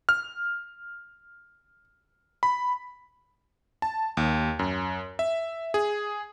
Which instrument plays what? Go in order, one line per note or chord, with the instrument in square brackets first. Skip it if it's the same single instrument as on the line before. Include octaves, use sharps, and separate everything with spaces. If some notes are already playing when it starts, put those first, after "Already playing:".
[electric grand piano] F6
B5
A5
D#2
F#2
E5
G#4